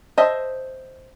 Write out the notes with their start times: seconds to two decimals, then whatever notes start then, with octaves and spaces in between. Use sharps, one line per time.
0.18 C5 D#5 E5 A5